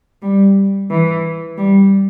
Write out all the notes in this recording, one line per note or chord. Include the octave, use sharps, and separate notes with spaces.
G3
E3
G3